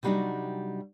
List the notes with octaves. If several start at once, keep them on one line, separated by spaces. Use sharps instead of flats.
C3 F#3 G3 D4 D#4 F#4